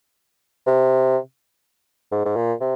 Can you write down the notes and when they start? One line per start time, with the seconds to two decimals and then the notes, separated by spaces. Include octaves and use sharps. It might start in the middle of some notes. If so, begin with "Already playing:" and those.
0.66 C3
2.12 G#2
2.25 G#2
2.36 A#2
2.60 C3